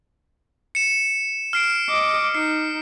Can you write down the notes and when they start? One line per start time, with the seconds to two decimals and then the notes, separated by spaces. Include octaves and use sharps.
0.75 C#7 E7
1.53 F6 C7 D7
1.89 D#5 D6
2.35 D#4 C7